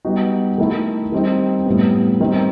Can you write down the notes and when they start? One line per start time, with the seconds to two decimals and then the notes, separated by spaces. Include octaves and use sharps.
0.05 G3 B3 D#4 F#4
0.58 D#3 A3 E4 A4
1.12 D#3 G3 C4 D#4
1.66 A2 G3 B3
2.20 D#3 G3 C4 D#4